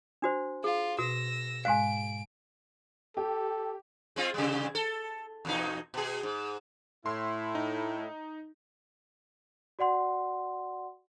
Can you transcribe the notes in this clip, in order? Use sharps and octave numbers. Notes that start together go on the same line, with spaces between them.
D4 F#4 C5
F4 G#4
B2 F#4 E6 A#6
G#2 G#3 F5 G#5 F#6 D7
G4 A4
G#3 C4 F4
C3 G3
A4
E2 B2 D#4
B2 G#4
G#2
A2 E4 C6
D#4
F#4 D5 F#5 C6